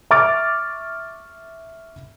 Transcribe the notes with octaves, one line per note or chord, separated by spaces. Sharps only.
E5 C#6 D6 F6 A6 D7